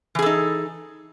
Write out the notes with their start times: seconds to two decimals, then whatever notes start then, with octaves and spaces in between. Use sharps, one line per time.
0.15 E3
0.19 G#4
0.22 A4
0.26 D#4